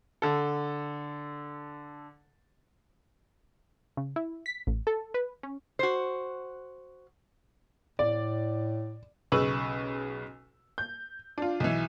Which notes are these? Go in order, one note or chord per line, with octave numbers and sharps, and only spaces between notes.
D3 A4
C#3
E4
B6
A1
A4
B4
C#4
F#4 C5
A2 D5
B1 C#3 B4 C#6 E6 F#7
G6
D4 F4
B1 E3